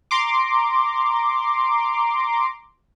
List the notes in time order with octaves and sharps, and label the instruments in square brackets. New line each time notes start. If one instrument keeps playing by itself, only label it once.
[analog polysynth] A#5 C6 D6